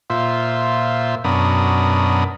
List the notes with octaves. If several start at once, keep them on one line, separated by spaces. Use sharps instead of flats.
A#2 F4 C5 E5
F#2 B2 D4 A#4 B5 D#6